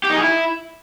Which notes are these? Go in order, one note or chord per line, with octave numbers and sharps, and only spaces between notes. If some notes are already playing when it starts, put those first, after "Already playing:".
G4
D#4
G#4
E4